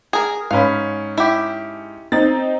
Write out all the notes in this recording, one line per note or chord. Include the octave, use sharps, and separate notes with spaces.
G#4 A#4
G#2 C#4 F5 B5
E4 G4
C4 D#4 A6